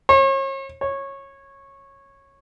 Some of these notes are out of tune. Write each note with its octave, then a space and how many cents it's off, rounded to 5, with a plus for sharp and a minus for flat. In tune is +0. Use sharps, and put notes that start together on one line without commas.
C#5 -40
C#5 -15